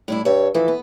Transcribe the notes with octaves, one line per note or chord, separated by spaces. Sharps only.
A2 G3 E4
G2 C#5 E5
E3 F3 A4
B3